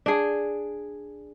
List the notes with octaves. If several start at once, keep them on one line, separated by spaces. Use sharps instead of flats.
D4 G#4